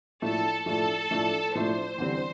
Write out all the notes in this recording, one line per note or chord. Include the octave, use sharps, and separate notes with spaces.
A2 F3 A3 D4 A4
A2 F3 A3 D4 A4
A2 F3 A3 D4
A2 F3 A3 D4 C5
E2 D3 G3 C4